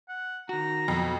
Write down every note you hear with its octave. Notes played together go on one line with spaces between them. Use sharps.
F#5
D#3 F#4 A#5
F2 B2 F#3